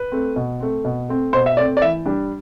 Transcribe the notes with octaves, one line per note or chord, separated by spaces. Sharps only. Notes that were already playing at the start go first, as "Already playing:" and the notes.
Already playing: B4
A3 C4
B2
A3 C4
B2
A3 C4
B2 C5
E5
A3 C4 D5
D5
E3 E5
G3 D4